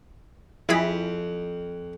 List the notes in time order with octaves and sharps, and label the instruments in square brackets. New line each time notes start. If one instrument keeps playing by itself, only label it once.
[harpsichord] F2 [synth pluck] E4 G#4 B5